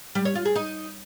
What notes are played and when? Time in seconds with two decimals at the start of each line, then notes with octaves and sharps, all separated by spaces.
0.15 G3
0.25 C#5
0.35 F4
0.45 G#4
0.55 D#4